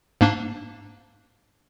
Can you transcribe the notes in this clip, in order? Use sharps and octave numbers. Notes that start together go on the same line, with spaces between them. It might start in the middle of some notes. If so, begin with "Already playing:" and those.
G#2 A#3 D4